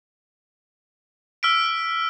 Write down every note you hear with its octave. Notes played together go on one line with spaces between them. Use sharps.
E6 F6 B6 D7